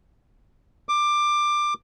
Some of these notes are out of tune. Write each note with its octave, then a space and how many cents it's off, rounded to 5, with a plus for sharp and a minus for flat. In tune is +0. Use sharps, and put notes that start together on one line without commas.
D6 +15